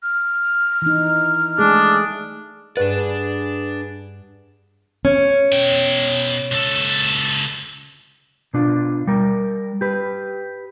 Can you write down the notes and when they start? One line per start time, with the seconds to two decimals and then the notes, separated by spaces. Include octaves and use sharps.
0.03 F6
0.82 E3 D#4
1.59 G#3 A3 D4 G#4
2.77 G2 D4 G#4 B4 D5 F#5
5.05 C#4
5.53 B2 G5
6.52 C#2 A4
8.54 B2 D4 F4
9.07 G3 A#4
9.81 G4 B4